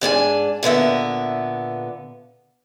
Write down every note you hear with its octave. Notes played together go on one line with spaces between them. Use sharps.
G#2 D4 C5 G#5
A#2 D3 B3 E5